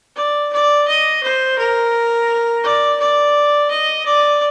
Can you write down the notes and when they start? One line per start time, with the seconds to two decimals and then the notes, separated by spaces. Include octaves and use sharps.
0.16 D5
0.53 D5
0.88 D#5
1.23 C5
1.58 A#4
2.63 D5
3.00 D5
3.70 D#5
4.05 D5